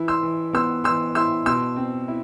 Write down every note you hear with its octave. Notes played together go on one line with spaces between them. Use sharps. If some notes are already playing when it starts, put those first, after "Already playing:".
Already playing: E3 E4
C6 E6
E3
B3 C6 E6
E3 C6 E6
E4 C6 E6
B2 C6 E6
C4
E4